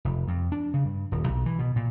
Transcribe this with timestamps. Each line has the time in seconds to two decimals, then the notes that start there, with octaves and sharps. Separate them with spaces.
0.05 F1
0.28 F2
0.52 D4
0.74 C#3
0.85 G2
1.12 D#1
1.28 B1
1.46 E3
1.59 B2
1.76 A#2